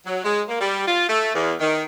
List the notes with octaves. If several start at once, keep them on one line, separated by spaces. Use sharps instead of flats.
F#3
G#3
A#3
G3
F4
A3
E2
D#3